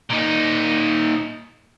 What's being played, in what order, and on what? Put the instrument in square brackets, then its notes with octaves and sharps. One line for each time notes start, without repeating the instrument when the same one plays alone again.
[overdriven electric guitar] A#2 D#4